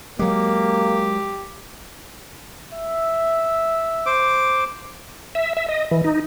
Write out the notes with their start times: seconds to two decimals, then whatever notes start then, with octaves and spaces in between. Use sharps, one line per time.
0.19 F#3 G#3 A#3 G4
2.74 E5
4.06 C5 D6
5.35 E5
5.57 E5
5.68 D#5
5.91 E3
6.04 D#4